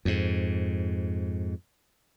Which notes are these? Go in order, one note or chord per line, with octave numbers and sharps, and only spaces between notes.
F2 G#2